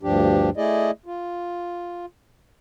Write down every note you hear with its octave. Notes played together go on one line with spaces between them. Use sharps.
D2 G2 F3 D4 G4
A3 E4 G#4 D5 D#5
F4